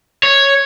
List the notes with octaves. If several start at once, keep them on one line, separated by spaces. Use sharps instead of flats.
C#5